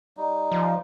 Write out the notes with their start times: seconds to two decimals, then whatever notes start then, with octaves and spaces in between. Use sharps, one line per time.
0.17 G3 D#4
0.52 F3